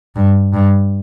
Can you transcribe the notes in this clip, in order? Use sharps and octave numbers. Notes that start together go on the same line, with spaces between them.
G2
G2